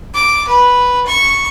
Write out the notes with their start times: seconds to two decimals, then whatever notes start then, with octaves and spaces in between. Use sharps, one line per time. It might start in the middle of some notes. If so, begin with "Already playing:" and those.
0.14 D6
0.48 B4
1.06 C#6